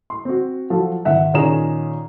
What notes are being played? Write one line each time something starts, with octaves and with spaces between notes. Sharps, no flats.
C6
C4 F#4
F3 F#3 A4
G#1 E5 F#5
A#2 D#3 C#4 G#4 A#5 E7